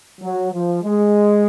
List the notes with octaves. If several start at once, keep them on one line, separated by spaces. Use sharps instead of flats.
F#3
F3
G#3